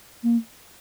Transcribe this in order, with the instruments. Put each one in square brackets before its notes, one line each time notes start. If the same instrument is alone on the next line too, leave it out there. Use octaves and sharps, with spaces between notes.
[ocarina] A#3